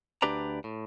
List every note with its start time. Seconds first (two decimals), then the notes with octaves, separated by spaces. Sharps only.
0.22 D2 D4 G4 B4 D5 A#5
0.64 A2